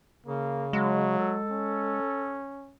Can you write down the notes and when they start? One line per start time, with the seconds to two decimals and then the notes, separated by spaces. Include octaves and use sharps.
0.26 C#3 A#3
0.73 F#3 G#3
1.19 A4
1.51 C#4